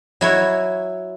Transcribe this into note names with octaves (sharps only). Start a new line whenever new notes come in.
F#3 E4 C#5